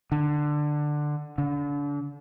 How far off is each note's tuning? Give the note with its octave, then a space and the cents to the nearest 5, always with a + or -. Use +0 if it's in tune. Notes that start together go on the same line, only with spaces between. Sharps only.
D3 +15
D3 -35